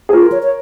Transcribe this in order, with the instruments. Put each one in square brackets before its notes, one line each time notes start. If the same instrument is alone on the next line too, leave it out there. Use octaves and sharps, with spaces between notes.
[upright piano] G#4
[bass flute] F4 [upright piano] A#4
[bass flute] C#5
C#5